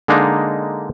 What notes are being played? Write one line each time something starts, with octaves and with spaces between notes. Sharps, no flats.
D3 G#3 A#3 D4 D#4